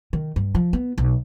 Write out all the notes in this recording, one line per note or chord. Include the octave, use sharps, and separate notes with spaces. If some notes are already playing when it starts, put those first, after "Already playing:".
D#3
G2
F3
B3
B1